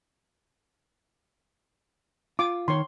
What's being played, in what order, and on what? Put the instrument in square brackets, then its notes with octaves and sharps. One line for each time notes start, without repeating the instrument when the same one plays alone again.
[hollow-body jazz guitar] F4 [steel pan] D6
[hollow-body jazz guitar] D#3 C#5 [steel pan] C6